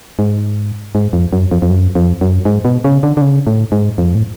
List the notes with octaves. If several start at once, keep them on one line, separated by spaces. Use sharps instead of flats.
G#2
G#2
F2
F#2
F2
F2
F#2
F2
F#2
G#2
B2
C#3
D3
D3
C#3
A2
G#2
F2
A2